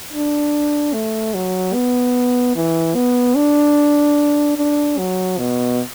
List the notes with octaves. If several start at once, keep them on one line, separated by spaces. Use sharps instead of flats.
D4
A3
F#3
B3
E3
B3
D4
D4
F#3
B2